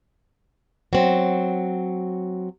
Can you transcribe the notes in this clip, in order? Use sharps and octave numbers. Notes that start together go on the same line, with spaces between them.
F#3 C4